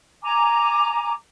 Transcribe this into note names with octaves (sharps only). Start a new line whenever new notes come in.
G#5 A#5 D6